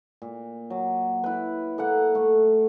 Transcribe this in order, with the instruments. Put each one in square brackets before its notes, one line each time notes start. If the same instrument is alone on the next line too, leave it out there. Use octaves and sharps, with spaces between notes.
[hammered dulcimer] A#2
F#3
E4 B4
A#3 A4 F#5
A3